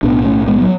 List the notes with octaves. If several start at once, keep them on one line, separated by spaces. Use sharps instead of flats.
B1 A2 B3 D4
A3 C#4
G#3 B3
F#3